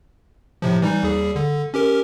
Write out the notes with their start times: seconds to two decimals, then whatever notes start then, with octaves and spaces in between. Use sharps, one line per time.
0.62 A2 C3 F3
0.82 E3 G3 D#4
1.03 D#2 G3 G#4
1.36 D3
1.74 C#4 G4 A#4